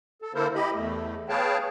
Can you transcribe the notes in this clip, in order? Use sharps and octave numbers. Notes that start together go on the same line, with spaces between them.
A4
D3 A#3 E4 A4 A#4 C5
E4 G4 D#5 B5
E2 A3
G#4 B4 C#5 F5 G5 A5